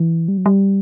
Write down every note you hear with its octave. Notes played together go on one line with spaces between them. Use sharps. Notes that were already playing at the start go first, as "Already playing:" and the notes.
Already playing: E3
G3
F#3
G3